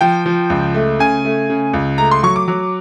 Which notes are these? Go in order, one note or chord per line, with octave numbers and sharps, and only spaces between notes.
F3 G5
F3
C#2
A3
C#3 G#5
A3
C#3
C#2
A3 A#5
C6
F#3 C#6
D6
F#3